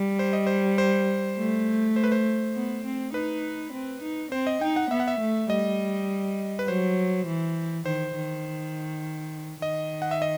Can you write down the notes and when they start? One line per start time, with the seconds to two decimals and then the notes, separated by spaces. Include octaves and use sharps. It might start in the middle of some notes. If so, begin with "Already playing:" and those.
Already playing: G3
0.19 C5
0.33 D#5
0.47 C5
0.78 C5
1.37 A3
1.96 C5
2.04 B4
2.12 C5
2.55 B3
2.85 C4
3.14 D#4 B4
3.73 C4
4.03 D#4
4.32 C4 C5
4.47 D#5
4.61 D#4 G5
4.76 F#5
4.91 B3 E5
5.00 F#5
5.08 E5
5.20 A3
5.50 G3 D#5
6.59 B4
6.68 F#3 C5
7.27 E3
7.85 D#3 C5
8.16 D#3
9.62 D#3 D#5
10.02 F#5
10.11 E5
10.22 D#5